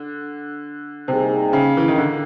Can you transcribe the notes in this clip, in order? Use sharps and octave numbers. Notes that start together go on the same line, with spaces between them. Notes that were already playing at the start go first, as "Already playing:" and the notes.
Already playing: D3
C3 G3 A#3 D#4 G#4
C#3
E3
D#3
D3